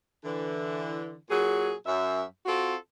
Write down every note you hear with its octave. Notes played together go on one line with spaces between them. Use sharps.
D3 E3
A#2 F#3 G#4
F#2 E5
C4 F4 F#4 A4